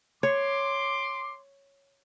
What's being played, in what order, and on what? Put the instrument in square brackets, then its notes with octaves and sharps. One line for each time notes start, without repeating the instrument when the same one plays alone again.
[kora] C#5 [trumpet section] C6 D6